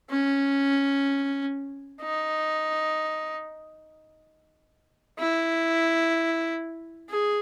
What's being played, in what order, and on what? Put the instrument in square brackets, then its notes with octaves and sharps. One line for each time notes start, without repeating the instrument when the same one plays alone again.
[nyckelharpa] C#4
D#4
E4
G#4